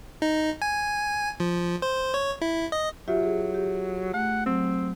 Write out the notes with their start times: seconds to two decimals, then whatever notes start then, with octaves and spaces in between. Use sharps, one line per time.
0.22 D#4
0.62 G#5
1.40 F3
1.82 C5
2.14 C#5
2.42 E4
2.72 D#5
3.08 F#3 F4 G4 E5
3.23 G#4
3.54 G4
4.14 A3 F#5
4.46 F#3 C4